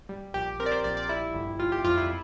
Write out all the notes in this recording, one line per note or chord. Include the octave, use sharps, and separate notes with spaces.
G3
A#1 G4
C4 A#4
D5
C5
A#1 D5
D5
G3 E4
G1
G3 F4
G4
F2 F4
E4